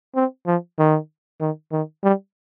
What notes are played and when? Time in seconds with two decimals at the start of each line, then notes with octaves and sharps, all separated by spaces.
0.16 C4
0.47 F3
0.79 D#3
1.41 D#3
1.72 D#3
2.03 G3